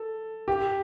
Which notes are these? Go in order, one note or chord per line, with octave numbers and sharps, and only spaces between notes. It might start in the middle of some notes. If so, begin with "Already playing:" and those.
Already playing: A4
G4